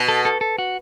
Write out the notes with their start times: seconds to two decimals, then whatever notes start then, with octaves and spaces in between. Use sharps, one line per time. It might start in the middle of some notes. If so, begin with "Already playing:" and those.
Already playing: B2
0.08 A4
0.25 A4
0.41 A4
0.58 F#4